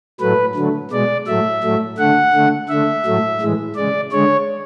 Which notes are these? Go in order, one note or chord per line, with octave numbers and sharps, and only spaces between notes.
A2 F#3 A3 B4
D3 F#3 A3
B2 G#3 D5
A2 F#3 A3 E5
A2 F#3 A3
D3 A3 F#5
D3 A3
D3 A3 E5
A2 F#3 A3
A2 E3 G#3
C#3 G#3 D5
D3 G#3 C#5